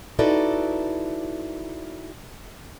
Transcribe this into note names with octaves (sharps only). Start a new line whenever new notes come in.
D#4 E4 F#4 A4 B4 D5